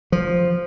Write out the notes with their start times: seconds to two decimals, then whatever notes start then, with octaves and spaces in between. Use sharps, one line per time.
0.12 F3